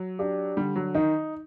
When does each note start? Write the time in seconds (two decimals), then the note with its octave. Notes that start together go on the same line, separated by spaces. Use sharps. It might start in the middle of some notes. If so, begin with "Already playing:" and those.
Already playing: F#3
0.19 D4 G4
0.57 D3 G3
0.76 F#3
0.95 D#3 D#4